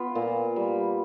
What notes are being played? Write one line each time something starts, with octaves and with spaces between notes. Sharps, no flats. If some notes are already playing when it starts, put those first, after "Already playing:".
Already playing: B3 F4
A#2
G3